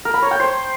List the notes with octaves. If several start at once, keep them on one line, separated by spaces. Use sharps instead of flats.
A#4
B5
C#5
G5
C5